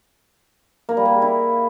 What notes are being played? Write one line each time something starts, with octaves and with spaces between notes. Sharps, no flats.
A#3
G3
A#3
G#4
E4